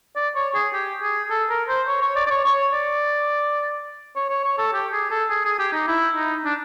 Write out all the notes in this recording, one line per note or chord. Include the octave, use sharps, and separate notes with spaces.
D5
C#5
G#4
G4
G#4
A4
A#4
C5
C#5
C#5
D5
D5
C#5
C#5
D5
C#5
C#5
C#5
A4
G4
G#4
A4
G#4
G#4
G4
D#4
E4
D#4
D4